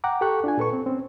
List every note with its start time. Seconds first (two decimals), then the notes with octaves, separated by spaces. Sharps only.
0.04 F#5 G5 A#5 D6
0.21 G4 A4 G5 C#6 F#6
0.44 D4 F4 G#5
0.58 A#2 A4 B4 C#6
0.73 C4
0.86 C4 C#4